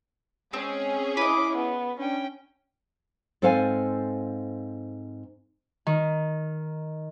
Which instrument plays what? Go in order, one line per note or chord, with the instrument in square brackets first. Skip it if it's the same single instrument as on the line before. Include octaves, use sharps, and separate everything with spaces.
[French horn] G#3 [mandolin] C4 [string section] C#4 G#4
[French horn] E4 [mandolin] B4 D#5 [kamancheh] D6
[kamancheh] B3
[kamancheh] C#4 G5 [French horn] D4
[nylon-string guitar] G#2 C4 A4 C5 F5 G#5
[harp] D#3